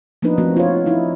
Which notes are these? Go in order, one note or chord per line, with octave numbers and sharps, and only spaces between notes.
F3 A#3 B3 D4 D#4 B4
F3 A3 B3 C4 F#4
F4 C#5
F3 D#4 E4